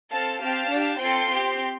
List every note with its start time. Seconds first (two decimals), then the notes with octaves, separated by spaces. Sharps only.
0.11 C4 A4 F5 A5
0.41 C4 G4 F5 A5
0.71 D4 G4
1.00 C4 F4 A4 G5 C6
1.30 C4 G4